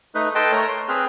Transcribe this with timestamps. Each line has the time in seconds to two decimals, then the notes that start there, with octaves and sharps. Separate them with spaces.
0.15 A3 D#4 B4
0.35 A4 B4 D#5 G5 A5 C6
0.52 A3 A#4 C#5
0.68 C6
0.89 C4 G#4 B4 F6